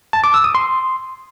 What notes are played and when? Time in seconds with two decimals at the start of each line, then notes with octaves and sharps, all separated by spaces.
0.13 A5
0.24 D6
0.34 E6
0.44 D#6
0.55 C6